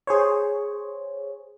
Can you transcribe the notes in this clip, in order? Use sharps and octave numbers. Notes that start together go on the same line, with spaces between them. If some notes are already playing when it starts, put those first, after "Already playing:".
G#4 C5 C#5